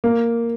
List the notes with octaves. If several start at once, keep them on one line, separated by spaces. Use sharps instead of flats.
A#3